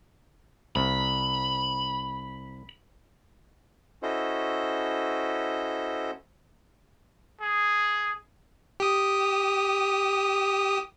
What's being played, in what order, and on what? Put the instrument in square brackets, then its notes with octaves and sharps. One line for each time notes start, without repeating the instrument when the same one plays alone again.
[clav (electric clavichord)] C2 [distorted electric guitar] B5
[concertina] C#4 E4 F#4 A4 C5 D#5
[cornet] G#4
[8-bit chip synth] G4 D#6